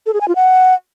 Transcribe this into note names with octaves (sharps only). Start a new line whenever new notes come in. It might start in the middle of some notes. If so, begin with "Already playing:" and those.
A4
G#4
G#5
F4
F#5